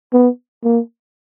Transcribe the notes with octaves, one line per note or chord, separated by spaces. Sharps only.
B3
A#3